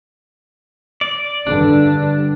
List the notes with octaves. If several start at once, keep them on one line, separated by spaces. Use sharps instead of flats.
D5
G2 D3 D4